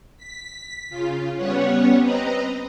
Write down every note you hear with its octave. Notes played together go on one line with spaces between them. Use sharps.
B6
C#3 F4
G3 B3 C#4 C#5 F#5
C4 B4 D#5 A#5